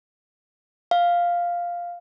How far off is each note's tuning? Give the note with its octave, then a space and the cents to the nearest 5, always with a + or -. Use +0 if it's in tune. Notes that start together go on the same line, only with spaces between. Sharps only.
F5 +0